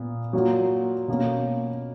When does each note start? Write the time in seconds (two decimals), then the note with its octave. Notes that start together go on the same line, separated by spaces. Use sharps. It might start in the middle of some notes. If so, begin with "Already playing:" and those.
Already playing: A#2 B3
0.33 F#3 A#3 F4
1.08 B2 A#3 C#4